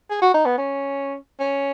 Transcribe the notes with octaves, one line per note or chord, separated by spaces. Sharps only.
G#4
F#4
D#4
B3
C#4
C#4